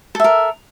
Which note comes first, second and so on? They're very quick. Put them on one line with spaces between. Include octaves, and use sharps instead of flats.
A4 E5 A#4